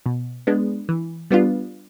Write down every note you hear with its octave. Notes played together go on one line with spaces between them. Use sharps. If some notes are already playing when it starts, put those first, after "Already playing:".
B2
G#3 B3 D4
E3
G3 B3 D4 F4